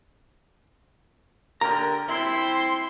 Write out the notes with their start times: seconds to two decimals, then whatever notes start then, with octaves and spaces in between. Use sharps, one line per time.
1.61 D3 G4 A#4 A#5
2.09 C4 E4 C6